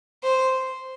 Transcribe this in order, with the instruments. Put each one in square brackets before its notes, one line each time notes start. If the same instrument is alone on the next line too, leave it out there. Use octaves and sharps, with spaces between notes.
[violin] C5